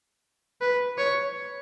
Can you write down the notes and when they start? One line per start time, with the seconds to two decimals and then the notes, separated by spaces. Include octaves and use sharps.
0.61 B4
0.98 C#5